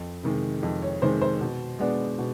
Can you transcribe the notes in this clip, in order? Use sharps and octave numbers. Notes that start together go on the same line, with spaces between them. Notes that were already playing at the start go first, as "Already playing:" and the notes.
Already playing: F2
C3 D#3 G#3
F2
C#5
C3 D#3 G#3 C5
C5
B2
G#3 B3 D4
B2